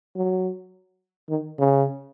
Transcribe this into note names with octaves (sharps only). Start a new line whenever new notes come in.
F#3
D#3
C#3